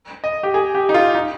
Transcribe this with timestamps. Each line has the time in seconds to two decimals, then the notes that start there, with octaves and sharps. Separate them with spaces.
0.24 D#5
0.43 G4
0.54 G#4
0.75 G4
0.89 D#4
0.94 F4
1.15 D#4